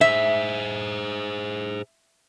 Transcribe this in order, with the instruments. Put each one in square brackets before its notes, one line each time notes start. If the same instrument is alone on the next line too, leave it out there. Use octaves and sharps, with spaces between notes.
[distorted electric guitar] G#4 C5 [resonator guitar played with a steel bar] E5